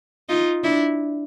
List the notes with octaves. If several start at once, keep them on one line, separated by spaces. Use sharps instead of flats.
D#4 F4
D4 E4